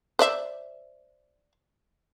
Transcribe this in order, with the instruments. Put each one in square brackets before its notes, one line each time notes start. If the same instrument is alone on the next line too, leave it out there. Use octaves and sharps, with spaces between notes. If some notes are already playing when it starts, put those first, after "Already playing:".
[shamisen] C5 D5 E5